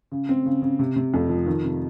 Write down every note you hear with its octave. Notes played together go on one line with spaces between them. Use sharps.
C#3
C4
C#3
C#3
C3
C3
F2
F3
D#3
C3